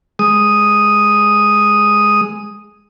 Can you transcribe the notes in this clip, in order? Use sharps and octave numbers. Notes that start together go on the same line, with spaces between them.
G#3 D#6